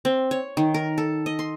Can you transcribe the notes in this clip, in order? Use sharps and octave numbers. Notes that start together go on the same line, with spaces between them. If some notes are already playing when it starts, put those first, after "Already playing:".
C4
C#5
D#3
A#4
A4
D#5
C6